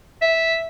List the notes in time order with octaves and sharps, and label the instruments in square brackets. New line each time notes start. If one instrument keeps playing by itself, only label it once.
[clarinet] E5